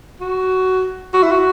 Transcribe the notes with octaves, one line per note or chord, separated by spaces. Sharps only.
F#4
F#4
E4
F#4